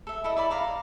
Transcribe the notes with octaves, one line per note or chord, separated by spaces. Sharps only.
A4 E5
E4 A4 D#5
E4 D5 B5
F5 A#5 D6